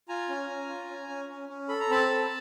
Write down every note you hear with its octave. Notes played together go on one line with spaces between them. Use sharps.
F4 G#5 A#5
C#4
C#4
F4
C#4
C#4
C#4
C#4
A4 B5
A#5
C4 A5 B5
A4